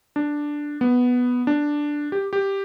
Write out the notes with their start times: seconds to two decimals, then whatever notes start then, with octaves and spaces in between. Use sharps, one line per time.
0.16 D4
0.81 B3
1.47 D4
2.12 G4
2.33 G4